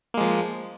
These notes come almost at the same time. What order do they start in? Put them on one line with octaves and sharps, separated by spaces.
A#3 G#3 F3